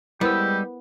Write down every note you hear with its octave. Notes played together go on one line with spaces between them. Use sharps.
G3 G#3 B3 E4 G4 A#4 C5 E6